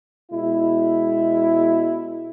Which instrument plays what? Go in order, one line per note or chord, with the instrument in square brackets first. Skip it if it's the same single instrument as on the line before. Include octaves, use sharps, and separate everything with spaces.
[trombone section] B2 G#3 E4